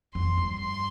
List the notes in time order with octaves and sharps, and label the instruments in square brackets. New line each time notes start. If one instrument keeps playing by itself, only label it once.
[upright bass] F2 [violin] C6
[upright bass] G2
[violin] C6